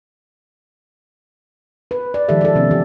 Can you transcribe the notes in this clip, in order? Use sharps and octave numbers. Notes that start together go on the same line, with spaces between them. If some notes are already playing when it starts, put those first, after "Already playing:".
B4
D5
D#3 F3 G#3 G4 A4 E5
A4 D5
C3 B3 C#4
E3 G4